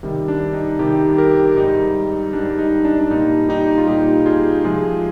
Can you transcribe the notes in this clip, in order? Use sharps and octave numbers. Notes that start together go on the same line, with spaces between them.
C3 D#3 G3
D4
D#4
C3 D#3 G3 D#4 G4
G4 A#4
G#2 G3 D#4
G#2 G3 D4
D#4
D4
D4
A#2 G3 D#4
D#4 G4
F4
A#2 G3 D#4 G4
F4 G#4
C3 F3 G#3 F4 G#4